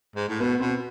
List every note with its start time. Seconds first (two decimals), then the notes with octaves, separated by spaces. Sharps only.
0.16 G#2
0.28 A2
0.40 B2 B3
0.60 B2 C4